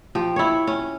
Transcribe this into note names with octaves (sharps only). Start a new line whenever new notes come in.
F3 G4
E4 C#5
C#4